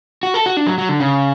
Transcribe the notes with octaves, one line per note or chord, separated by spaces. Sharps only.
F#4
A4
F#4
D4
F#3
F#3
D3
C#3